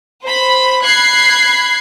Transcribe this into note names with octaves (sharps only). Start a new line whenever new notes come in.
C5 B5
B5 F#6 G#6 C7